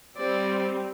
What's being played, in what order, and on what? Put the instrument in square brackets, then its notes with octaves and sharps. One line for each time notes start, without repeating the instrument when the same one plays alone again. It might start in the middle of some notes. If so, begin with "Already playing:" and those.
[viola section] G3 C4 [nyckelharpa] C5 D5